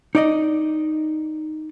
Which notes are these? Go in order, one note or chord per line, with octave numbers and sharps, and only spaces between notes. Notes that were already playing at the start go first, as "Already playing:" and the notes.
D#4 D5 D#5